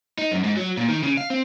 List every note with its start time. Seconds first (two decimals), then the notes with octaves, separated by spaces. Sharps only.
0.18 D#4
0.32 F#2
0.44 G#2
0.57 F#3
0.77 A#2
0.89 D#3
1.03 C#3
1.17 F5
1.30 C4